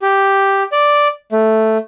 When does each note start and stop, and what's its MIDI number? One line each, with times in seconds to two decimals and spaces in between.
0.02 0.63 67
0.72 1.08 74
1.32 1.78 57